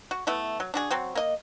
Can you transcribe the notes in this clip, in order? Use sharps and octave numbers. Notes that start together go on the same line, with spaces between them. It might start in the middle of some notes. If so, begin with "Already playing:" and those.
F#4
A3 B3 E4
F#3
D4 F#4 G#4
F#3 C4 F#4
A#3 D#5